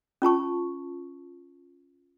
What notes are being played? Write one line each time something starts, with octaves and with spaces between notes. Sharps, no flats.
C#4 F4 A5 C#6